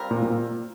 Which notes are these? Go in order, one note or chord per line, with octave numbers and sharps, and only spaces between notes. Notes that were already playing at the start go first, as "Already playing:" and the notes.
Already playing: G3 C4 F4 A#4
A#2
A#2